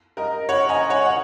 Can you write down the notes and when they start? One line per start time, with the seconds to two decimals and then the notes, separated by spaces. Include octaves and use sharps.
0.17 A#4 D#5
0.49 C#5 F#5
0.69 D#5 G#5
0.89 C#5 F#5
1.05 F#5